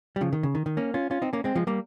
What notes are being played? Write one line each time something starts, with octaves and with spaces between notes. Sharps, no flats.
G3
C#3 F3
D#3
C#3
D#3
D#3
A#3 C#4
C#4 F4
C#4 F4
C4 D#4
A#3 C#4
G#3 C4
F3 G#3
G3 A#3